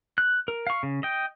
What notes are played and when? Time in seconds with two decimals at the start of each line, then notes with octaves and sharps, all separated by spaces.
0.18 F#6
0.48 A#4
0.67 F5 C#6
0.83 C#3
1.03 D#5 G5